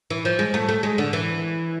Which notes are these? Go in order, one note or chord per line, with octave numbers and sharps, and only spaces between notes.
E3
F3
G#3
A3
A3
G#3
D3
E3